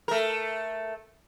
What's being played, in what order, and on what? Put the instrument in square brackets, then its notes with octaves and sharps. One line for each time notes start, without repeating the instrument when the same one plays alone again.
[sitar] A3 A#4